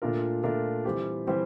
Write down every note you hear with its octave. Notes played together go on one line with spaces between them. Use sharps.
A#2 A3 D4 F4 A#4
A#2 A3 D4 F4 A#4
E3 G3 C4 G4
E3 G3 C4 G4